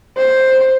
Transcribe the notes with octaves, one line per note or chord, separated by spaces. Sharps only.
C5